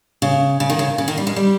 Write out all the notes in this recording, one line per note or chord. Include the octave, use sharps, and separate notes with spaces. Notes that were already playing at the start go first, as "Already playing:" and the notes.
C#3
C#3
D#3
C#3
C#3
D#3
G3
G#3
G3